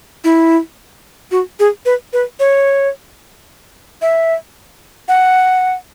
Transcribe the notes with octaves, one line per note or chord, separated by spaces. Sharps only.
E4
F#4
G#4
B4
B4
C#5
E5
F#5